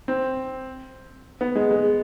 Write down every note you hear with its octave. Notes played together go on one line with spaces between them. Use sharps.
C4
B3
G#3
G#3